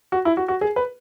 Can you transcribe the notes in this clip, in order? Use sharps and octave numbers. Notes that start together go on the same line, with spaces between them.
F#4
E4
F#4
F#4
G#4
B4